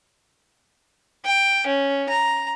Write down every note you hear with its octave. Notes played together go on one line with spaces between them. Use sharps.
G5
C#4
A#5